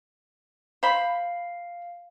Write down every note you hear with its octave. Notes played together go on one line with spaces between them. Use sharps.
C5 F5 B5